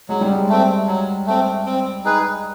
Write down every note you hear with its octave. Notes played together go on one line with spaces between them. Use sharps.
F#3 G#3
G3
G#3
A3 C4
F#3
A3 C4
C4
D#4 G#4 B4